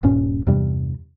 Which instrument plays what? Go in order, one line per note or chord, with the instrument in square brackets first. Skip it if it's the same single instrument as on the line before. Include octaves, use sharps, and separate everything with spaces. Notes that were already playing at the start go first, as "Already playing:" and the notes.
[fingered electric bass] D#1 G2 A#2 C#4
E2 G2 C3 G3